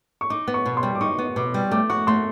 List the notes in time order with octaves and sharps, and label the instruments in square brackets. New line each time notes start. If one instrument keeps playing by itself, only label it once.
[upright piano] C#6
[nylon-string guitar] D#4 [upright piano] D6
[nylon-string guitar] B3
[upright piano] C#6
[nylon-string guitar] B2
[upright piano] C6
[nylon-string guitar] G3
[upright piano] D6
[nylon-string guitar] D#4 [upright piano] C#6
[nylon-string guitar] B3
[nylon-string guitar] B2 [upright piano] D6
[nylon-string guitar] G3
[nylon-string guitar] A3 [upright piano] D6
[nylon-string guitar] F#4 [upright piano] C#6
[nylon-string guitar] A3 [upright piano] C6